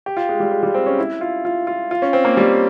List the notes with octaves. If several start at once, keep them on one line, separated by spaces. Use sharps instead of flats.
G4
F4
G#3
G3
G#3
G3
C4
C#4
E4
F4
F4
F4
F4
C#4
C4
A#3
G3